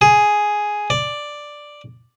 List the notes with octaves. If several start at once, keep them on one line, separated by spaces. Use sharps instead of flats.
G#4
D5